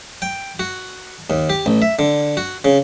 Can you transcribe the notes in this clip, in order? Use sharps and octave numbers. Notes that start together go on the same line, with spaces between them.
G5
F#4
D#2
G4
A1
E5
D3
F#4
C#3